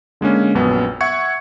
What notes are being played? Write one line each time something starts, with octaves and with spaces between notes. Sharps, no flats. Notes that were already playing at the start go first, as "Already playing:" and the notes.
D3 G#3 A#3 C#4
A#1 F#2 B3
E5 F#5 C#6 G#6 C#7